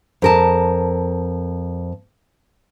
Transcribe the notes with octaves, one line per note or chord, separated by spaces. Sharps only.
F2 A#4 A5